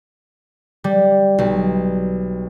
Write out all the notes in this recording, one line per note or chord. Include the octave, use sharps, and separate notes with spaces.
G3
B1